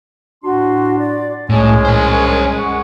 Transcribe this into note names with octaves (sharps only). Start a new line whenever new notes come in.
A2 D4 F#4 C6
D5
C2 A2 G#3 C#4
A#4 C5
F#2 F#5 C#6